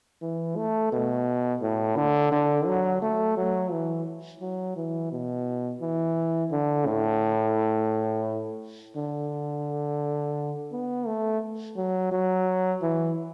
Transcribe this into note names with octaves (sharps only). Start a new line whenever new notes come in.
E3
A3
B2
A2
D3
D3
F#3
A3
F#3
E3
F#3
E3
B2
E3
D3
A2
D3
B3
A3
F#3
F#3
E3